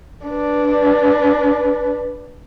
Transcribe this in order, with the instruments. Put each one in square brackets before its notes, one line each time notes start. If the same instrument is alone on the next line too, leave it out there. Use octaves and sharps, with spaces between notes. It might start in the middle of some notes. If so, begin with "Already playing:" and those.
[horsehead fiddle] D4 B4